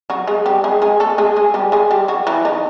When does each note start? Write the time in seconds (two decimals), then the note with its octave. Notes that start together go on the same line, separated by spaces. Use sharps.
0.10 F#3 F#4
0.27 G#3 G#4
0.46 G3 G4
0.64 G#3 G#4
0.82 G#3 G#4
1.00 A3 A4
1.18 G#3 G#4
1.36 G#3 G#4
1.54 G3 G4
1.72 G#3 G#4
1.91 G3 G4
2.08 F#3 F#4
2.27 E3 E4
2.45 D#3 D#4